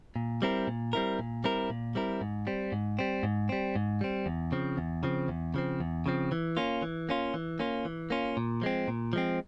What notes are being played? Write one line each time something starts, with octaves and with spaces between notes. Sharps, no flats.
A#2
G3 C4 E4 A#4
A#2
G3 C4 E4 A#4
A#2
G3 C4 E4 A#4
A#2
G3 C4 E4 A#4
G#2
G3 C4
G#2
G3 C4
G#2
G3 C4
G#2
G3 C4
E2
C#3 F3 C4
E2
C#3 F3 C4
E2
C#3 F3 C4
E2
C#3 F3 C4
E3
A#3 C#4 F4
E3
A#3 C#4 F4
E3
A#3 C#4 F4
E3
A#3 C#4 F4
A#2
F3 G#3 C4
A#2
F3 G#3 C4